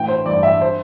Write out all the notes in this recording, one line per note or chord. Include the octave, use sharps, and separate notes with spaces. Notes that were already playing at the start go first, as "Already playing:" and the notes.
Already playing: A1 G5
C5
G2 E3 D5
E5
C5